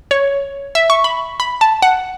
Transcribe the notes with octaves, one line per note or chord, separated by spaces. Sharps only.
C#5
E5
C#6
B5
B5
A5
F#5